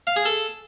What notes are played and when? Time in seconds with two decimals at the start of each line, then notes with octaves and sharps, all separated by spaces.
0.07 F5
0.16 G#4
0.25 A4